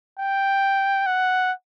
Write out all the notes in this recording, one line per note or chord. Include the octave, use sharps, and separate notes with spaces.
G5
F#5